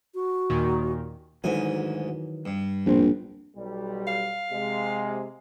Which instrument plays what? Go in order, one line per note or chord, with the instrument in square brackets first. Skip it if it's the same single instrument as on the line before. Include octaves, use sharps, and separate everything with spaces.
[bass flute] F#4
[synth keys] D#2 A#2 D#3
[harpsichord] D2 G#2 G#5 [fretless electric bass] D#3 E3 F#3
[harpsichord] G2
[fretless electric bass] D1 F3 C4 [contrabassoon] A#1
[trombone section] B1 G3
[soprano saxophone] F5
[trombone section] C3 G#3